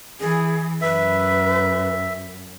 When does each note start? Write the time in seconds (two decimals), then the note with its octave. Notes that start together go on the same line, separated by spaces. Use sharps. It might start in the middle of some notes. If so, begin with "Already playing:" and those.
0.20 E3 G#4
0.81 F#2 B4 E5